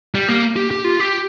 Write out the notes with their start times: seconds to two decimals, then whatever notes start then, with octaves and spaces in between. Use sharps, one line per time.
0.15 G3
0.28 A#3
0.56 G4
0.71 G4
0.84 F4
1.00 G4